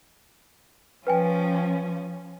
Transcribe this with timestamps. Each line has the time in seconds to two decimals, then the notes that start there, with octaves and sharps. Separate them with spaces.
1.07 F3 C#4 B4 G5 G#5